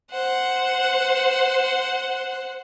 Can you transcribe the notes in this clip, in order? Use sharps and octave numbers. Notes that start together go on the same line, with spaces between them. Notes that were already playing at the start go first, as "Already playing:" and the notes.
C5 F#5